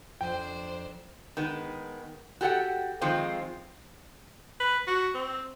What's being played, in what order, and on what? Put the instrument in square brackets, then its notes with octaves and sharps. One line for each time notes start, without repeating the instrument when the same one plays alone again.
[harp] F2 [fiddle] D4 C5 [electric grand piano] G5
[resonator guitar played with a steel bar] D#3 G#3 B3
F#4 G4 A4 D5 F#5 G5
D#3 F3 G#3 C4 F4 C5
[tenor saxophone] B4
F#4
C4